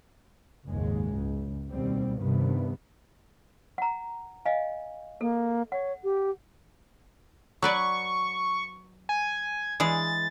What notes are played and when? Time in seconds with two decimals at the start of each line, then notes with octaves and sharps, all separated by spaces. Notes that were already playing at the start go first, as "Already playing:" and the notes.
0.68 F#1 D#2 G#2 G#3
1.12 C#2
1.69 D#2 B2 G3 C4
2.18 G2 C3 D#3 B3
3.78 F#5 A#5
4.45 D#5 F5 G#5
5.21 A#3 A4
5.72 C#5 F#5
6.04 G4
7.62 F#3 B4 D5 C#6
9.09 G#5
9.80 E3 G#3 G#4 A6